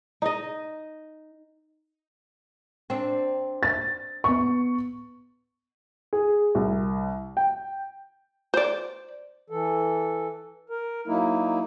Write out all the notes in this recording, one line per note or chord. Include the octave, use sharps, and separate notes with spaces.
D#4 D#5
C4 D4
A6
B3 C#6
G#4
C2
G5
C5 D5
E3 A4
A#4
F#3 A#3 D#4 E4